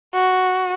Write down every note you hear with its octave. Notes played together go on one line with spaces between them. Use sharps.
F#4